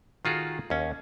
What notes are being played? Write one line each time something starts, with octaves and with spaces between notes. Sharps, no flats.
D#3 F4 F#4 G#4 A4
D#2 C#4